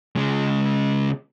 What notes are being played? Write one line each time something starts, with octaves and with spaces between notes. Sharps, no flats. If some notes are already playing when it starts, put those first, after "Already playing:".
C#3 G#3